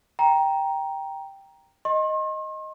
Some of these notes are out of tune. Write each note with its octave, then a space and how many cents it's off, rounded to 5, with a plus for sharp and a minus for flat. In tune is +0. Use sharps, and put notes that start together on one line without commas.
G5 +0 A#5 +10
D#5 +0 C6 +45